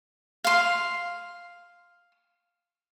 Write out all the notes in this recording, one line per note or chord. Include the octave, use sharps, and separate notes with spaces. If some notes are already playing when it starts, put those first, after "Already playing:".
F5 C6